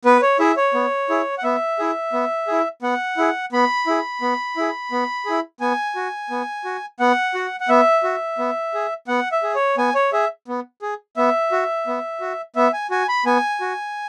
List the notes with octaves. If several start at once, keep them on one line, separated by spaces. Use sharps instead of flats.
B3 B4
C#5
E4 G#4 E5
C#5
B3
E4 G#4
F#5
B3 E5
E4 G#4
B3
E4 G#4
B3 F#5
E4 G#4
B3 B5
E4 G#4
B3
E4 G#4
B3
E4 G#4
B3 G#5
F#4
B3
F#4
B3 F#5
F#4
F#5
B3 E5
F#4
B3
G#4
B3 F#5
E5
G#4
C#5
B3 G#5
C#5
G#4 E5
B3
G#4
B3 E5
F#4
B3
F#4
B3 E5
G#5
F#4 G#5
B5
B3 G#5
F#4